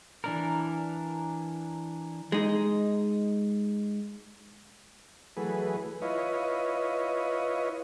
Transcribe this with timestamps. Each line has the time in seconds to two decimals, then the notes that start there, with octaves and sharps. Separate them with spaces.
0.24 E3 D4 A#4
2.32 G#3 D#4
5.37 E3 F#3 A3 G#4 B4
6.02 E4 F4 B4 C#5 D#5